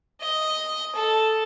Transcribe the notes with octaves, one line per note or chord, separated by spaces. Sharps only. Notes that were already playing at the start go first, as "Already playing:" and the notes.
D#5
A4